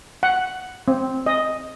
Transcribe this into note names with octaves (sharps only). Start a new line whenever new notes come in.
F#5
C4
D#5